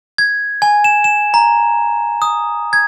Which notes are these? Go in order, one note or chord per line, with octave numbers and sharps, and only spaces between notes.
G#6
G#5
E7
E7
A#5
D#6
G#6